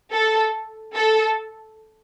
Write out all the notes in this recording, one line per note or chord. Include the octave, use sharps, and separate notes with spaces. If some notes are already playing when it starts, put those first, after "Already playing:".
A4
A4